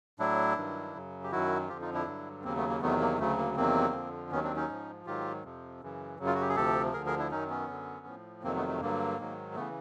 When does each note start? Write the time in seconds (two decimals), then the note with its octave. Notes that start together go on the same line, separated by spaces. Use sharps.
0.19 A2 F#3 D4 E4
0.57 G2 D#3 F#3
0.94 F#2 C#3 F#3
1.24 G4
1.32 F#2 D#3 F#3 E4 F#4
1.69 F2 D3 F3 F4 G4
1.81 D#4 F4
1.94 D4 E4
2.07 G2 D3 F#3
2.44 D#2 C#3 F#3 A#3 C4
2.57 A3 B3
2.69 A#3
2.81 E2 C3 D#3 F#3 A3 B3
3.00 A#3
3.19 D2 C#3 F#3 A3
3.38 A#3
3.57 E2 C3 D#3 F#3 A#3 C4
3.94 F2 D3 F3
4.31 D#2 D#3 F#3 B3 C#4
4.44 C4 D4
4.56 C#4 D#4
4.69 G#2 F3
5.06 G#2 D#3 F#3 F4 G4
5.44 F2 C3 F3
5.81 F#2 C#3 E3
6.19 F#2 C#3 F#3
6.26 F4
6.35 F#4
6.41 G4
6.49 G#4
6.56 D2 C3 F3 G4 A4
6.93 D2 D3 F3 G#4 A#4
7.06 G#4 A#4
7.18 D4 E4
7.31 F#2 D#3 F#3 C#4 D#4
7.50 B3 C#4
7.69 F#2 D3 F#3
8.06 A2 F3
8.43 F2 C3 D#3 F#3 A#3 C4
8.56 A3 B3
8.68 A3
8.81 G2 D3 F#3 A#3
9.18 G#2 D#3 F#3
9.56 C#3 E3 A3 B3